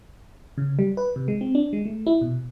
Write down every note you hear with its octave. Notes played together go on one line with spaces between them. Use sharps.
C#3
G3
B4
C3
G#3
C4
D4
G#3
A3
E4
B2